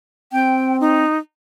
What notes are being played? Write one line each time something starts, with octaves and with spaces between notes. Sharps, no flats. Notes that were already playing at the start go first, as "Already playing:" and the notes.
C4 G5
D#4